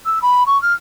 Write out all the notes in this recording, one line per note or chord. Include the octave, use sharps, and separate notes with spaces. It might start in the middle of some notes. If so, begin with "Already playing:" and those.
E6
B5
C#6
F6